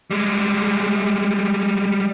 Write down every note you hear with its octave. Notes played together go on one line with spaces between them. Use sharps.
G3 G#3